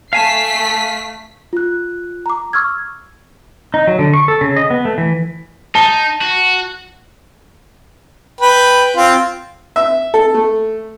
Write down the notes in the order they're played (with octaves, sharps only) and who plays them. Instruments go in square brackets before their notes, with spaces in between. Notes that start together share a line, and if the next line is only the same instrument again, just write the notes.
[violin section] A3 B6 C7 [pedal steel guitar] F5 G#5 A5
[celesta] F4 F#6
A#5 D6
C#6 E6 F6 G#6
[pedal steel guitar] D#4
F#3
D3
C#6
A4
C#3
D#5
B3
A3
E3
[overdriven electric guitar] D#4 [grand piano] A5 G7
[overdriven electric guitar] F#4
[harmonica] B4 G5
C4 F4
[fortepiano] E5
A4
A3